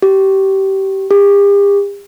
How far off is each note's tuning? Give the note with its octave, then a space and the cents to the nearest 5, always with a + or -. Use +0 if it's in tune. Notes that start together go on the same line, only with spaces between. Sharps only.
G4 -25
G4 +40